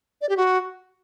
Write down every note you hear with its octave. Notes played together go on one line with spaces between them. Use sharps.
D5
G4
F#4